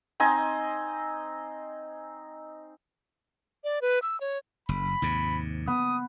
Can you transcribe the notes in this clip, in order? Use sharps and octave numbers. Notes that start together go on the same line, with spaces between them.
C4 D#4 D#5 G#5
D5
B4
E6
C#5
F#1 B5
D#2 G#2 C3
B3 D#6